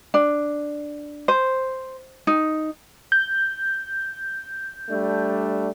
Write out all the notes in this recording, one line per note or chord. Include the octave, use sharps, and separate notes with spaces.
D4
C5
D#4
G6
G3 A3 D4